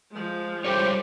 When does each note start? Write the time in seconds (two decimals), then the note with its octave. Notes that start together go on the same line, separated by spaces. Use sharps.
0.11 F3 G#3
0.65 C#3 G3 G4 A4 C5 C#5